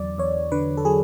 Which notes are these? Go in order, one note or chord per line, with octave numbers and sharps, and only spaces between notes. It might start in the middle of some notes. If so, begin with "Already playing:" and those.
Already playing: E2 D3 F#3 D5
E2 C#5
D3 B4
A4
F#3 G#4